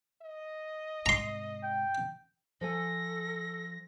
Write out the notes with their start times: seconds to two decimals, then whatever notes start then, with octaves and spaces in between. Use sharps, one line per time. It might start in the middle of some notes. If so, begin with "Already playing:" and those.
0.22 D#5
1.06 G#2 C3 A#5 C6
1.64 G5
2.61 F3 A4 G#5 A#6